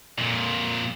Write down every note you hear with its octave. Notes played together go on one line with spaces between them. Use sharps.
F2 A#2